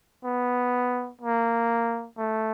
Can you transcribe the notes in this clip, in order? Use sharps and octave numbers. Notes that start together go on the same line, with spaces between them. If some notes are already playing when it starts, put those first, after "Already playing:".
B3
A#3
A3